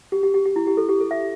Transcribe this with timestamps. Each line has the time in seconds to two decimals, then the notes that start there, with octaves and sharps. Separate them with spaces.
0.12 G4
0.23 G4
0.34 G4
0.45 G4
0.56 E4
0.67 G4
0.77 A4
0.89 G4
1.00 A4
1.11 E5